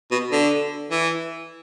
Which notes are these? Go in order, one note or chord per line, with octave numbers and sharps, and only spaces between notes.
B2
D3
E3